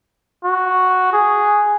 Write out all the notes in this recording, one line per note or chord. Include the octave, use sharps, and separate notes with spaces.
F#4
G#4